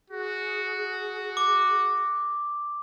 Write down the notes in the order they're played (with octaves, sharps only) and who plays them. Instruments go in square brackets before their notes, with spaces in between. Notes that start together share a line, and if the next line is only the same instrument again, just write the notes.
[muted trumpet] F#4 [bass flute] G#4
[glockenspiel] D6